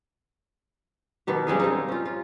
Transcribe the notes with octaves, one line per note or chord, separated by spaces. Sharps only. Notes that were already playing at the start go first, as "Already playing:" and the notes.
B2 D#3 G4
C#3 G3 G#3 G#4
G3 C4 D#4
C#4 F4
F4